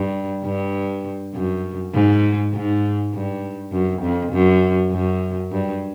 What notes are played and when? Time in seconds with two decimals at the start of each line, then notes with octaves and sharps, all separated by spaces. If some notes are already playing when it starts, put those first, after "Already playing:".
Already playing: G2
0.45 G2
1.34 F#2
1.94 G#2
2.53 G#2
3.14 G2
3.72 F#2
4.02 F2
4.32 F#2
4.92 F#2
5.52 G2